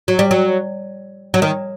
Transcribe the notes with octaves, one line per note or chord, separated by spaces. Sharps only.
F#3
G3
F#3
F#3
D#3